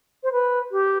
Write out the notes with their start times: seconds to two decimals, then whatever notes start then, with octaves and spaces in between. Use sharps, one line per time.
0.23 C5
0.32 B4
0.71 G4